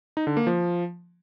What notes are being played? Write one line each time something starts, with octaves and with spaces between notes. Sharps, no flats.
D#4
D3
A#3
F3